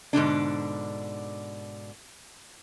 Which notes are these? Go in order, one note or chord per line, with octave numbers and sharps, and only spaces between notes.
G#2 B2 D3 D4